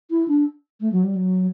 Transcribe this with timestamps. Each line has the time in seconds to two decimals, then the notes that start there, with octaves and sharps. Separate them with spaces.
0.10 E4
0.28 D4
0.80 A3
0.92 F#3
1.04 G3
1.15 F#3